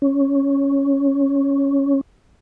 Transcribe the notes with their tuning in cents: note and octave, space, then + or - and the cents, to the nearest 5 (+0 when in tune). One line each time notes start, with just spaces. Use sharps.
C#4 +0